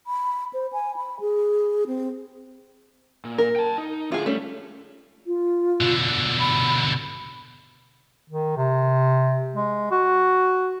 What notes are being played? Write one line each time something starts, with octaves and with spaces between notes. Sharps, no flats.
B5
C5
G#5
B5
G#4
C4
A#2
A#4
G5 A5
D#4
A2 D3 F4 G#4
G3 A3 C#4
F4
B2 D3
B5
D#3
C3
G#3
F#4